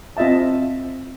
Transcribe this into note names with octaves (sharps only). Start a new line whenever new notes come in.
C4 F4 D#5 E5 A5